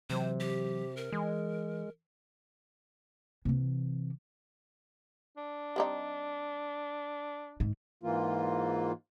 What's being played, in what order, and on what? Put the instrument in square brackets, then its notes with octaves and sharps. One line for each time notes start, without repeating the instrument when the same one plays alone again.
[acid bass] C3 [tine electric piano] E3 F#3 [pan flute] C5
[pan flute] G4
A#4
[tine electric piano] E3 [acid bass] G#3
[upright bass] C3 E3
[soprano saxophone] D4
[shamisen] G3 C4 D#4
[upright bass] G#2
[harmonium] G#2 E3 A#3 F4